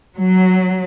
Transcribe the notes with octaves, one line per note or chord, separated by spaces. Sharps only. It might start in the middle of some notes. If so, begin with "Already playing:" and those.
F#3